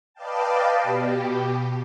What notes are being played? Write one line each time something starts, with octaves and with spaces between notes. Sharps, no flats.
B4 D5 D#5 F5 G5 A5
B2 G4